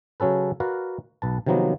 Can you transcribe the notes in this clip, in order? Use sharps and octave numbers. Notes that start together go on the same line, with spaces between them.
C#3 F#3 C#4 A4 B4
F#4 A#4 B4 D5 F5 F#5
B1 B4 A5
C3 D#3 F3 F#3 A#3 B3